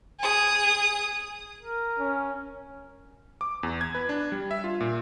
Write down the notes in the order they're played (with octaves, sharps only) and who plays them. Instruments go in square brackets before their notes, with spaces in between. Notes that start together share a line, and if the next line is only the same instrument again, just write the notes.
[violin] G#4 D#6
[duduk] A#4
[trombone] C#4
[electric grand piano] D6
E2
G#6
B4
D4
G3
E5
F4
A#2